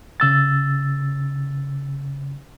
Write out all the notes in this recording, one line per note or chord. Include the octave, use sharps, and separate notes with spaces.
C#3 E6 A6